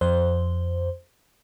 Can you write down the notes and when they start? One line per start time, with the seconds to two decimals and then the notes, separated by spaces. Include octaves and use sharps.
0.01 F2 C5